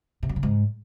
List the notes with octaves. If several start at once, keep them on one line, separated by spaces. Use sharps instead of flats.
C3
F#2
C#3
G#2